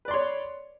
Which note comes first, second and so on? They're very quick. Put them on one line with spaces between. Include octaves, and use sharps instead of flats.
B4 D5 C6 C#5